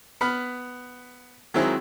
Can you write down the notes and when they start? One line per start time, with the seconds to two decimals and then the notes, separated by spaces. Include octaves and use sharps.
0.21 B3 B5 F6
1.54 D#3 F#3 G#3 C4 E4 G#4